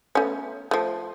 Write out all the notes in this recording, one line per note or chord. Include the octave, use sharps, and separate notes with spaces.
A3 B3 C#4
F3 A3